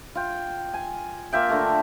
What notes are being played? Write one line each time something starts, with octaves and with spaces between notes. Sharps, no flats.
F4 G5
G#5
A#3 F4 E5 G5
D3 A3 A#4